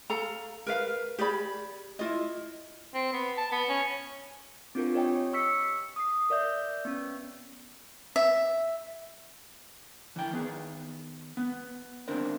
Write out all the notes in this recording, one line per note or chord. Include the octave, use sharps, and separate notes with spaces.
A4 F5 A#5
A#4 B4 F5
G4 G#4 D5 B5
E4 F4 D#5
C4
B3
A5
B3
C#4
C4 D4 F4 G4 A#4
G4 C#5 D#5 G5 G#5
C#6 E6 B6 C#7
D#6 C7
A#4 D5 E5 G6
B3 C#4
E5
E3 G5
D#3 B3 G#4
B3
D#2 C4 D4 A#4 C5